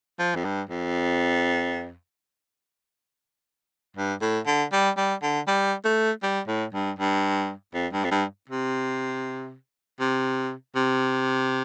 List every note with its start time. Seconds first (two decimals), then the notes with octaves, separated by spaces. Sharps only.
0.19 F3
0.35 F2
0.45 G2
0.70 F2
3.97 G2
4.22 A2
4.47 D3
4.73 G3
4.97 G3
5.23 D3
5.48 G3
5.85 A3
6.23 G3
6.48 A2
6.74 G2
6.99 G2
7.74 F2
7.93 G2
8.05 F2
8.11 G2
8.50 C3
10.00 C3
10.75 C3